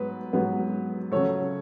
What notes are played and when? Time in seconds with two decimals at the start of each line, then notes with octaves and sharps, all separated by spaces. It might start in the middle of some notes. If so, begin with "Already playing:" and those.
Already playing: G#2 F#3 B3 B4
0.33 G#2 F#3 B3
1.12 C#3 F#3 A3 A4 C#5